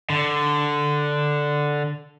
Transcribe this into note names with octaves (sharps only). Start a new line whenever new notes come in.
D3